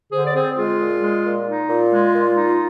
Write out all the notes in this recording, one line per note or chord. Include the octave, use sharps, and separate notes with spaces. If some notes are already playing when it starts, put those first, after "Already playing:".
D3 G#4 C5
D5
C4 G#4 C5
G#3 F4 G#4
A#2
G#3
A#2
D#4
A#2 F4
G#3
A#2
D#4